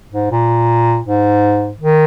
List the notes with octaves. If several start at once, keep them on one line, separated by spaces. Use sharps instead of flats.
G#2
A#2
G#2
D#3